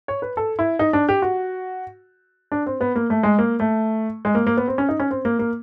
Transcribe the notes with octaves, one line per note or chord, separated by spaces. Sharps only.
C#5
B4
A4
E4
D#4
D4
G4
F#4
D4
C4
B3
A#3
A3
G#3
A#3
A3
G#3
A#3
A#3
B3
C4
C#4
D#4
C#4
C4
A#3
A#3